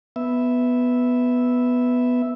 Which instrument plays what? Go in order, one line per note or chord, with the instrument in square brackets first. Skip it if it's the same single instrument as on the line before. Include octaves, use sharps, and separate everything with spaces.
[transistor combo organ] B3 E5